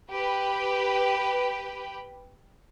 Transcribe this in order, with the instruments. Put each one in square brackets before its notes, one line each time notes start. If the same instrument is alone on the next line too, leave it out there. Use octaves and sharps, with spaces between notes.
[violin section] G4 B4 G5 B5